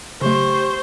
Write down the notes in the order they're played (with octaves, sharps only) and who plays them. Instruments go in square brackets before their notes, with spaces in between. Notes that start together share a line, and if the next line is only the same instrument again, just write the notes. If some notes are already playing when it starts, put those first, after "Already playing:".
[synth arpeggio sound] C#3 F#3 A3 [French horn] G4 [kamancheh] C5 [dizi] C#6